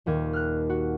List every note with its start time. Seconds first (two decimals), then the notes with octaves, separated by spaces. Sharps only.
0.06 D#1 D#2 G#6
0.33 F6 F#6
0.70 F#4